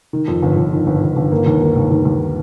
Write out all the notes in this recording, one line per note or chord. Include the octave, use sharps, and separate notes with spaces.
D#3
F2
G1
G1
D#3
G1
G1
G1
A#3
D#2
A#3
D#2
D#2
D#2